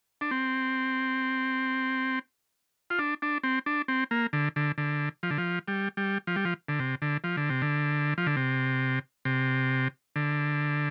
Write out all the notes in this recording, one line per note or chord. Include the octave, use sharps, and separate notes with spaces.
D4
C4
F4
D4
D4
C4
D4
C4
A#3
D3
D3
D3
F3
D3
F3
G3
G3
F3
G3
F3
D3
C3
D3
F3
D3
C3
D3
F3
D3
C3
C3
D3